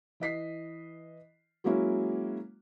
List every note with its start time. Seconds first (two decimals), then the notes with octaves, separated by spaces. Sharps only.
0.20 E3 D#5 B6 C7
1.64 F#3 G#3 A#3 C#4 E4 F#4